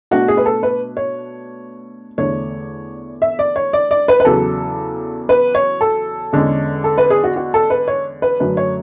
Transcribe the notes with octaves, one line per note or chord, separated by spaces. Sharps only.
B2 A3 D4 F#4
G#4
B4
A4
B4
C#5
E2 D3 A3 D4 C#5
E5
D5
C#5
D5
D5
B4
B4
E2 C#3 F#3 A4
B4
C#5
A4
E2 D3 G#3 C#4
A4
B4
G#4
F#4
F#4
A4
B4
C#5
B4
F#2 D3 F#3 A3 C#4 B4
C#5